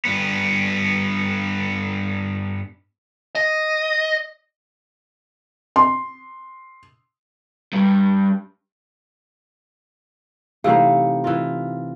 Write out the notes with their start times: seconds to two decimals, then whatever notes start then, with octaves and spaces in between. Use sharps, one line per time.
0.05 G2 B3
3.35 D#5
5.76 C6
7.73 G2
10.64 C3 E3 A3 D#4 F5
11.24 E3 F4